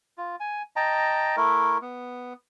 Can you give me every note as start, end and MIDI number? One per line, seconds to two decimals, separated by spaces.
0.18 0.36 65
0.40 0.62 80
0.76 1.36 75
0.76 1.36 79
0.76 1.36 81
0.76 1.36 82
1.37 1.78 57
1.37 1.78 64
1.37 1.78 70
1.82 2.33 59